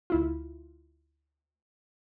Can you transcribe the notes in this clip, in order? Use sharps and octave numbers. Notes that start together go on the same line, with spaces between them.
D2 E4 F4